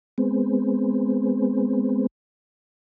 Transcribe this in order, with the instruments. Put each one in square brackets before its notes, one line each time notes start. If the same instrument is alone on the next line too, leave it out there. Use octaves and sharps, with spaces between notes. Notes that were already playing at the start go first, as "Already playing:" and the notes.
[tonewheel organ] G#3 B3 C4